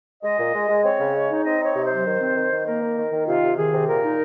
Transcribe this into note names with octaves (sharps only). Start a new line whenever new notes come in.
G#3 D#5
A#2
G#3
G#3
C4 C#5
C#3
G#3
D#4
C4 D#5
D#4 C#5
C3
C5
F#3
D#3
C4
D#3
D#3
A#3 A#4
D#3
D#3
D#3
C3 F4
C3
D#3 G#4
C3
A#2 A#4
D#4